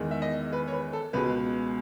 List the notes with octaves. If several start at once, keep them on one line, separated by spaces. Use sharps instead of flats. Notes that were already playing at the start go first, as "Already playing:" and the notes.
Already playing: E2 D#3 G#3
E5
D#5
B4
C#5
B4
A4
C#2 B2 G#3 B4